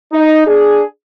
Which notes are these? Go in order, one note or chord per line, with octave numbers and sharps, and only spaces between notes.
D#4
D4 G#4